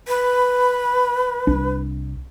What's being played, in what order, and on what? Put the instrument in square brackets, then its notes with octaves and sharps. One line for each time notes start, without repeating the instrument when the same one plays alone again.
[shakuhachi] B4
[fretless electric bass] C2 D4